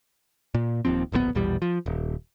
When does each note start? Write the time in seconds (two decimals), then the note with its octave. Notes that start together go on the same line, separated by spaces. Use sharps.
0.54 A#2
0.85 D#1 D#2 F3 C4
1.12 D1 A#1 B2 B3
1.35 A#1 E2 B2 G3
1.62 F3
1.86 D#1